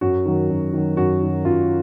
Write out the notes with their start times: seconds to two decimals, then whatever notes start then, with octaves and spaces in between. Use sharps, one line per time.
0.01 F#2 F#4
0.25 D#3 F#3
0.50 F#2
0.73 D#3 F#3
0.97 F#2 F#4
1.21 D#3 F#3
1.45 F#2 F4